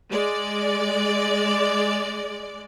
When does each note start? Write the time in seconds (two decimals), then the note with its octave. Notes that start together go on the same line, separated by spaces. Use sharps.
0.11 G#3 D5